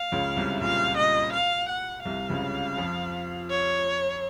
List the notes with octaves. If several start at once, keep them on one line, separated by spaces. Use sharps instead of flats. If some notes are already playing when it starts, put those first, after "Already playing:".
Already playing: F5
C#2 C#3
C2 C3
A#2 F5
D#5
F5
F#5
C2 C3 F5
C#2 C#3
F2 F3
C#5